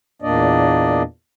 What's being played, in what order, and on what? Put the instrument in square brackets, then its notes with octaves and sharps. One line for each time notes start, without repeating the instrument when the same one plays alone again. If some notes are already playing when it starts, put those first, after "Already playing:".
[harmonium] E2 A#2 A#3 D4 D5 D#5